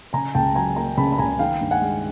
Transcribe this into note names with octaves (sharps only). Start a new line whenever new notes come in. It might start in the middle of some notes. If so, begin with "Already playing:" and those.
C#3 G#5 A#5
C#2 G5 A5
F#3 G#5 A#5
A#3 G#5 A#5
C#3 A5 B5
B5
C#2 G#5 A#5
D#3 F5 G5
G2
F#5 G#5
G#3